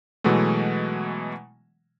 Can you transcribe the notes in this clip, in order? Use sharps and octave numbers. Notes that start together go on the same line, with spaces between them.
B2 E3 F#3 G#3 A3